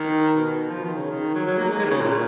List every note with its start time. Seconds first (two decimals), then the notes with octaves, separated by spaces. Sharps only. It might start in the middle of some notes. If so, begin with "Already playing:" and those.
Already playing: D#3
0.37 B2
0.69 F3
0.84 D#3
0.97 C#3
1.11 D#3
1.35 F#3
1.46 F#3
1.57 A#3
1.68 G#3
1.79 G#3
1.85 D#3
1.90 C#3
2.01 A#2